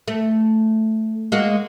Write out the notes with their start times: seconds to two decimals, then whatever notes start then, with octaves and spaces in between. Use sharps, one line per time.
0.08 A3
1.32 G#3 A#3 F#4